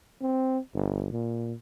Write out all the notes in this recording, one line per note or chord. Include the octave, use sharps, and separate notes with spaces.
C4
G1
A#2